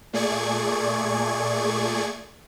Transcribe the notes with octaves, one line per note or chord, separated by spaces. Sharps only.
A#2 A3 G#4 D5 C#6 G#6